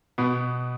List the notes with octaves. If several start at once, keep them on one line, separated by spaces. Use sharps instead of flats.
B2 B3